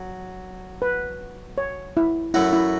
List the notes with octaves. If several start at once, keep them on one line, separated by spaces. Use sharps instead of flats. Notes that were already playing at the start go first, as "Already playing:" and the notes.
Already playing: F#3
B4
C#5
E4
F#2 F#3 A3 E4 F#4
E4